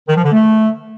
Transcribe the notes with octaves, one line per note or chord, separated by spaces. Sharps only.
D#3
F3
D3
A3